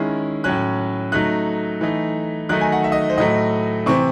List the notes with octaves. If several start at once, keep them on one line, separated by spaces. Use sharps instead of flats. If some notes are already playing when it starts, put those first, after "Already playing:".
Already playing: D#3 G#3 C#4 E4
A2 F#3 C#4 F#6
F#3 A3 D#4 F#6
E3 A3 D#4
D#3 F#3 A3 D#4 F#6
G#5
F#5
E5
D#5
C5
A2 F#3 A3 D#5
C3 E3 C4 C#6